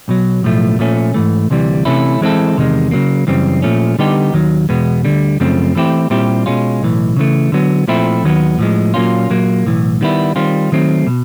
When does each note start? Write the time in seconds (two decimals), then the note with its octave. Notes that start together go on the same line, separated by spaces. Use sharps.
0.08 B1 B2 F#3
0.43 B1 A2 F3 A3
0.79 A#2 F3 A3 C#4
1.14 G#2 E3 A3
1.50 D2 C3 E3 G3
1.85 C3 E3 A3 C#4 E4
2.21 E3 G#3 C4 E4 A4
2.57 E2 C3 D#3 G#3
2.91 C#3 F#3 A#3
3.27 F#2 C#3 E3 G3 C4
3.62 A#2 F3 A3 C#4
3.99 D3 G3 B3 D#4 G4
4.33 D#2 D#3 F#3
4.69 E2 B2 G#3 B3
5.05 D2 D3 G3
5.40 F#2 C#3 F3 A3 C4
5.75 E3 A3 C4 E4 G4
6.10 A#2 G3 C4 E4 G4
6.46 B2 G#3 C#4 F4
6.82 B1 A2 E3
7.17 C#3 E3 A3
7.52 D3 F#3 B3
7.88 A#2 F3 A3 C4 E4
8.23 D#2 D#3 F#3 B3
8.59 A2 F3 G#3
8.94 A#2 F#3 A#3 C#4 F4
9.30 A#2 F#3 A#3
9.66 B1 A2 E3
10.01 D#3 G3 B3 E4
10.36 D#3 G3 C4 F4
10.72 D#3 F#3 A3 C4
11.07 B2